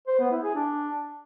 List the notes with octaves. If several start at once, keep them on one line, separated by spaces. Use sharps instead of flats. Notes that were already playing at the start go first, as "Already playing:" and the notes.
C5
B3
E4
G#4
D4